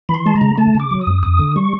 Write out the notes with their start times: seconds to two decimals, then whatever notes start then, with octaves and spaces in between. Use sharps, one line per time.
0.09 E3 B5
0.14 C6
0.26 G#3 A5
0.36 A#5
0.41 C#3
0.58 A3 A5
0.75 C#3
0.80 D6
0.91 F#3
1.01 D#6
1.07 F#2
1.23 F2 D#6
1.39 D3
1.56 G3 C#6